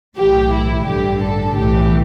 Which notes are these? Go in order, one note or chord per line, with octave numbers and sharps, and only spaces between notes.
B1 A2 E3 G4
E4
A1 G2 D3 G4
A4
B1 A2 E3 G4